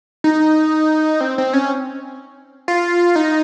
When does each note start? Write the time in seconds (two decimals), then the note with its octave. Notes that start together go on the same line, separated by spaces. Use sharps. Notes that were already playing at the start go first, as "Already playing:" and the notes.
0.24 D#4
1.21 C4
1.38 C4
1.53 C#4
2.68 F4
3.16 D#4